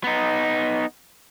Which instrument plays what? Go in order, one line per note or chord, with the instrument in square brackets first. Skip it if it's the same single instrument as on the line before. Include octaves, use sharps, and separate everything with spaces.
[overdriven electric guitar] B3 D#4